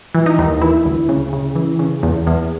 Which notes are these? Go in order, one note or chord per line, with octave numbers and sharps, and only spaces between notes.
E3
D#4
D#2
E3 E4
D2
C#3
C#3
E3
C#3
E2
E2